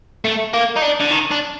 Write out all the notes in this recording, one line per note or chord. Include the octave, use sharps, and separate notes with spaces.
A3
A#3
D#4
D4
D3
D#3
D4